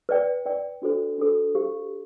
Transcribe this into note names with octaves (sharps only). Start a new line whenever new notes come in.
B4 D5 G5
B4 D5 G5
D4 F#4 A4 C5
D4 F#4 A4 C5
G4 C5 F5